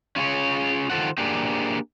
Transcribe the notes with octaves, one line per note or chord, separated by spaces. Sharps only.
C#4 F4 F#4 G#4 C#5
D#3 F4 G#4 A4 C5 F#5
A#3 D4 G4 G#4